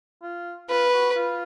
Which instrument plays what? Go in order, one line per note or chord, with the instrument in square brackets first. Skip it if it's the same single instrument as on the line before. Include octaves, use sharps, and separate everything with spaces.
[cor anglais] F4
[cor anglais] F4 [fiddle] B4
[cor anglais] F#4
F4